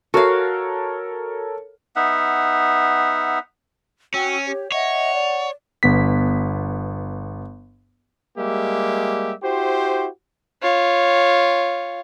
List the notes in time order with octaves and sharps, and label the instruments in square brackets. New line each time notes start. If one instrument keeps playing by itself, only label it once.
[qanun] F#4 F5 [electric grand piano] A4 A#4 C#5
[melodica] B3 D#4 E5 F#5
[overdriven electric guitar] C#4 [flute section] F#4 G5 E6
[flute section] G4 C#5
[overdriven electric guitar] C#5 [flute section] D#5 E5 [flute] F#5
[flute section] D5
[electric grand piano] G1 B3 B6
[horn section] G3 G#3 A#3 G4 E5
E4 F#4 G4 C5
[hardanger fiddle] F4 C#5